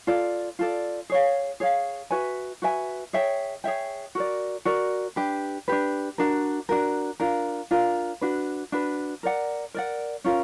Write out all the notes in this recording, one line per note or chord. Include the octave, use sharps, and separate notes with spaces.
F4 A4 D5
F4 A4 D5
G#4 C#5 F5
G#4 C#5 F5
F#4 B4 E5 G#5
F#4 B4 E5 G#5
G#4 C#5 E5 G5
G#4 C#5 E5 G5
F#4 A#4 D5
F#4 A#4 D5
D4 G4 B4
D4 G4 B4
D4 F#4 A#4
D4 F#4 A#4
D4 F4 A#4
D4 F4 A#4
D4 F#4 B4
D4 F#4 B4
A#4 D5 F#5
A#4 D5 F#5
C#4 F4 A#4